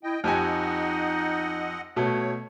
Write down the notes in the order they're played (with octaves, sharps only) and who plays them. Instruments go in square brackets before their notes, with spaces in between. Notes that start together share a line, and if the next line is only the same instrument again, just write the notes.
[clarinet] E4 [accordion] D#5 G5
[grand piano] F2 G4 G#5 [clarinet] D#4 [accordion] D#5 F#5
[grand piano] B2 A3 [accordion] C#5